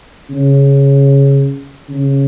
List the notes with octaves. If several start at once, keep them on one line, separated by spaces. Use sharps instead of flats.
C#3
C#3